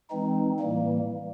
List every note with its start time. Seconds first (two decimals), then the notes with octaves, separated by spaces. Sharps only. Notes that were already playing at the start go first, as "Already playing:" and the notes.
0.10 E3 G#3 C4 D#4
0.60 A2 E3 G3 A#3